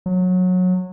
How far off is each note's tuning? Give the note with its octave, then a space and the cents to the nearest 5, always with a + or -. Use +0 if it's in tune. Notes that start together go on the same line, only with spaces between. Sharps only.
F#3 -20